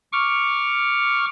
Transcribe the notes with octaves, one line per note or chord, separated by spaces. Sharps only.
C#6 D6 F6